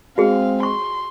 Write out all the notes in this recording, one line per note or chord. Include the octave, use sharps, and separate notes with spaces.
G#3 C4 F#4 G#4 F5
C6 C#6